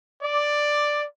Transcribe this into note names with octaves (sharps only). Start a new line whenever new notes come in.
D5